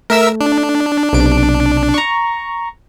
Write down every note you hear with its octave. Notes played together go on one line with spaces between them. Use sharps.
A3 A#4 E5 E6
D4
B1 C3 D7
A#5 C#6